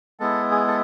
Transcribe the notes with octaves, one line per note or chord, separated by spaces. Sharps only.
G#3 B3 E4 A4
G#4
A4